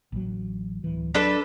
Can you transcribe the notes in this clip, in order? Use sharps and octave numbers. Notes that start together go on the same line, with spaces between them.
A1 F#3
D1 E3
F#3 D4 A4 B4